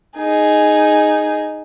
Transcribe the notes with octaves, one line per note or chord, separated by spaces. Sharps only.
D#4 G#4